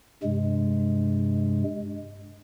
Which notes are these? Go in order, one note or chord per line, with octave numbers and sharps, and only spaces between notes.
G2 C3 G#3